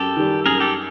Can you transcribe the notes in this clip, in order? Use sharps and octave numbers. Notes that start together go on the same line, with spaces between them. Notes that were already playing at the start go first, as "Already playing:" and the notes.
Already playing: F#2 G4 A4
D#3 G3
F#2 G#4 A#4
G4 A4